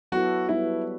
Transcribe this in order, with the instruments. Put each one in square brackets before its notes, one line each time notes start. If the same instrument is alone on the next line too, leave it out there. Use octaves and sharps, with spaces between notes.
[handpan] F#3 B3 E4 A4 [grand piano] F#4
[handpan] G3 B3 F#4 B4 [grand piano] E4